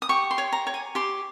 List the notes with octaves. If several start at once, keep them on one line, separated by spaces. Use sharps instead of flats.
D#6
G4 C#6
C6
C#5
A#5
C#5
G#5
G4 C6